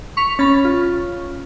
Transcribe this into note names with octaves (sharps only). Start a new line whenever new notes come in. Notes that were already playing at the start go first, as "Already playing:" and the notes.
C#6 B6 F7
C#4 B5 A6
F4